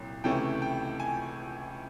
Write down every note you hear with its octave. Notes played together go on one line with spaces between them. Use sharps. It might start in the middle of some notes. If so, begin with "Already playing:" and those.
Already playing: C2 A#2 F#3
C#2 C3 E3 A3 C#4 G5
G5
G#5